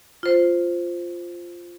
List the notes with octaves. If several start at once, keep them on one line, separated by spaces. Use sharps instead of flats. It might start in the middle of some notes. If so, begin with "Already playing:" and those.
F4 C5